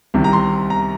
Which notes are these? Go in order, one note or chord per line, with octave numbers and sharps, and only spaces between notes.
C2 C3 D#3
A#5
C6
A#5